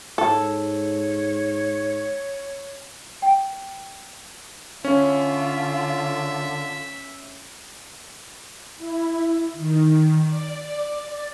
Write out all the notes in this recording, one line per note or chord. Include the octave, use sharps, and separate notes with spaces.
G#2 A4 C#5
G5
D3 C#4 F4 E5
E4
D#3
D5